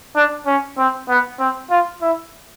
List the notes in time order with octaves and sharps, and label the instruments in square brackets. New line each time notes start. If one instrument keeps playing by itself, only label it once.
[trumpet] D4
C#4
C4
B3
C4
F4
E4